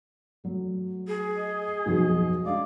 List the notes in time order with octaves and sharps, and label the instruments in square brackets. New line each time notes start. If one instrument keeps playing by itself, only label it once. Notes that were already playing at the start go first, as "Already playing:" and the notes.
[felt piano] F#3 A3
[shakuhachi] G#4
[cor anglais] D#5
[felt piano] B1 F2 F#4
[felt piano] G#3 D4 [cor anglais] D5 [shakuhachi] F5